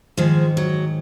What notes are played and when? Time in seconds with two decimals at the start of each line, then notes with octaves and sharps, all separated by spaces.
0.17 G#2 D#3 F3 G#3
0.57 F#3